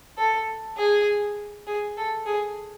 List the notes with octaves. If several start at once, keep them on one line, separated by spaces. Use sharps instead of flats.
A4
G#4
G#4
A4
G#4